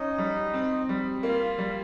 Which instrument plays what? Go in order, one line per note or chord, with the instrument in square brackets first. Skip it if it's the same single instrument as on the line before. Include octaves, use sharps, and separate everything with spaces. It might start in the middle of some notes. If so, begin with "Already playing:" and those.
Already playing: [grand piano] C#4 [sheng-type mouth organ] D#4
[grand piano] G3
C4
G3
[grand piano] A#3 [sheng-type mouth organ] F4
[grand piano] G3